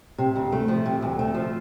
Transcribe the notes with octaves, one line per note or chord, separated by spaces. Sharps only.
C3
D2
A3
F3
C3
D2
A3
F3